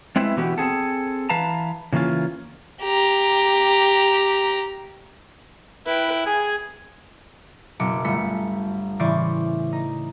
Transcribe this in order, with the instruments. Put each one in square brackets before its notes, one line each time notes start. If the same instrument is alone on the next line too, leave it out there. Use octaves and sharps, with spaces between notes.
[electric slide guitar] G#3 C4 E4 B4 E5
B2 D3 E3 B3 F#4 G4
C4 G#4 A4
E3 B4 F5 A5 A#5
C#3 E3 A#3 C#4 F4
[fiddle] G4 A#5
[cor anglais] E4 [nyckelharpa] B4 G5
[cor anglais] G#4 [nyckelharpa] G#5
[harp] F#1 B2 D6 C#7
G1 A3 B6 C#7
A2 C#3 E3 C5 D5 C#6
D#4